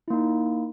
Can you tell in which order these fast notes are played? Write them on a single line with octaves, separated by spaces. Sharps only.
E4 A#3 D#4